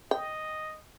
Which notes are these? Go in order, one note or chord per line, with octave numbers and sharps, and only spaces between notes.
D#5 G5